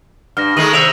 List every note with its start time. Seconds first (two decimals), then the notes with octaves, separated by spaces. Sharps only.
0.37 G2 F6 A#6
0.57 D#3 G#3 A3 D#6 D#7 F#7
0.73 C3 E5 E6 D7 F7